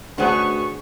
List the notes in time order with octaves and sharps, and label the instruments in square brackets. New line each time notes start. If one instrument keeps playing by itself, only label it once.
[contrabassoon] D2 [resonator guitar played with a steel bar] B3 C#4 G#4 [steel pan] D4 C5 F#5 [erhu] C#6